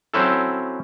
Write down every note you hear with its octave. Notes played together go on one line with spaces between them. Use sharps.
F#3 C4 C#4 E4 A4